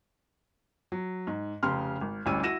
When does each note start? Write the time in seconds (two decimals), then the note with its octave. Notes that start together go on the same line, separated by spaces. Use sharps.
0.92 F#3
1.27 G#2
1.63 F1 C#3 G4 C6 F6
2.01 G#1
2.26 A1 D2 G3 C#4 E6 D#7
2.43 E4 F#4 E6 A#6 D#7 E7